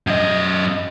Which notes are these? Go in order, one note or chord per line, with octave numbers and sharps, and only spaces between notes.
F#2 D#5